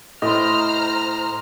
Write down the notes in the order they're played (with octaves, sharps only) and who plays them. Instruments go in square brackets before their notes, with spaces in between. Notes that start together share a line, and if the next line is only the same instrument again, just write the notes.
[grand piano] A2 [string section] C5 A#5 F6 [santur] D#5 C6